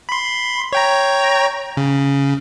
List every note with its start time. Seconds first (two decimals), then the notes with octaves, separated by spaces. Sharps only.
0.09 B5 C6
0.72 C#5 G5 A#5
1.77 C#3